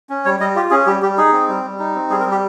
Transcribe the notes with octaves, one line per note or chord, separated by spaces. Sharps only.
C#4
G3 C#5
G3 D#5
F4 G4
C#4 G#4
G3 G4
G3 G4
D#4 G#4
C4
G3
G3
D#4
C4
G3 G#4
A#4
G3
G4